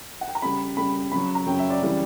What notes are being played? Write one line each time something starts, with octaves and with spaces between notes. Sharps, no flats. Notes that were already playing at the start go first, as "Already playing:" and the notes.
F#5
G5
A#5
C#3 G3 B5
C#3 G3 B5
C#3 F#3 B5
A#5
C#3 F#3 G5
E5
D5
C#3 E3 G3